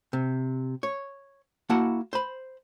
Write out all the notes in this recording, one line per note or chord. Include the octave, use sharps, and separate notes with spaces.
C3
C#5
A#3 E4 F#4 F#5 A5
C5 B5